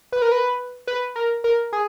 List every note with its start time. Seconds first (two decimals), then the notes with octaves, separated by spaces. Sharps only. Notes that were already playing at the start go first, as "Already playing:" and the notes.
0.12 B4
0.22 A#4
0.32 B4
0.87 B4
1.16 A#4
1.44 A#4
1.73 G#4